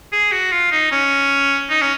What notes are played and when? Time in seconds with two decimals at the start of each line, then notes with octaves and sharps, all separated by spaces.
0.12 G#4
0.32 F#4
0.52 F4
0.72 D#4
0.92 C#4
1.70 D#4
1.82 C#4